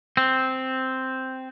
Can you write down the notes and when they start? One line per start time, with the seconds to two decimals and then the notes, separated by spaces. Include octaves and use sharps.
0.17 C4